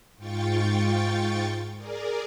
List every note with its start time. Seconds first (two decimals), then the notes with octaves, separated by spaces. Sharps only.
0.17 G#2 F4 G5 C#6 A6
1.77 G#4 A#4 D5